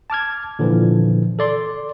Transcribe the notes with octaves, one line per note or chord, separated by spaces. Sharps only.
A5 D6 F6 G#6
A#2 D3 E3 F3
A4 D5 C6